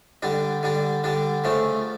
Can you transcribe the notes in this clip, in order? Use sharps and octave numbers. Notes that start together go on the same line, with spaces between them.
D3 G3 D4
D3 G3 D4
D3 G3 D4
C#3 F3 A3 D4